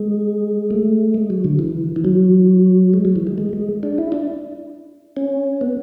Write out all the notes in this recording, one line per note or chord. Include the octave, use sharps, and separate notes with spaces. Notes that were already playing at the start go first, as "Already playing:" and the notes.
Already playing: G#3
A3
G#3
F#3
D3
E3
E3
F#3
G#3
F#3
E3
G#3
G#3
G#3
D4
E4
D4
C#4
B3